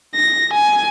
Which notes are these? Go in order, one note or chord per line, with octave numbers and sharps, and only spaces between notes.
A#6
G#5